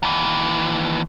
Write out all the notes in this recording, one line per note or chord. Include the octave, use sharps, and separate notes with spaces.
D#2 E3